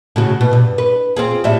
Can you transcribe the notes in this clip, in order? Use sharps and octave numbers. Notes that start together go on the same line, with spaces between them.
A2 C#3 F#4
B2
G2
B4
C4 F4 G#4
A2 G3 E5